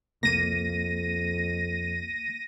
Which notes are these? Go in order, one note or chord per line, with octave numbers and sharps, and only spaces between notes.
C2 F2 A#3 A#6 D#7